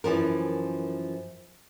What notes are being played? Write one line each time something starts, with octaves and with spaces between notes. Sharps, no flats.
F#2 E3 F3 A#4